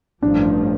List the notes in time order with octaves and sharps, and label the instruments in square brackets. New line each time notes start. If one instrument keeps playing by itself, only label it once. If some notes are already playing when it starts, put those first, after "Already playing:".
[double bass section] A1 G2 F3 [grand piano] D4